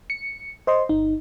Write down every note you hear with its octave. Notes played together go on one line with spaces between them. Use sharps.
C#7
C5 D#5 C6
G1 D#4